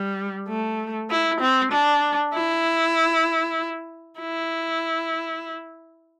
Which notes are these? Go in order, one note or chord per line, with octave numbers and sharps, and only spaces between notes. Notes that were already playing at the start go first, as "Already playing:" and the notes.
Already playing: G3
A3
E4
C4
D4
E4
E4